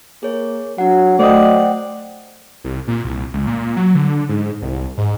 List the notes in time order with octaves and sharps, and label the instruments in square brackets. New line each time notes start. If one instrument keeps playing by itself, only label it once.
[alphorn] A#3 [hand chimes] G#4 C#5
[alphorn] F#3 [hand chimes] D4 F#5
[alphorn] F#3 [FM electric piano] A3 D#5 [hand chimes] C5 F#5 G5 [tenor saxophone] D5
[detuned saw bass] C2
A#2
C2
C#2
A#2
F#3
D3
G#2
C2
G#2